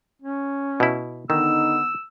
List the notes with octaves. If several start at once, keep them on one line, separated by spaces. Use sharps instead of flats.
C#4
B2 E4
D3 D#3 B3 D#4 E6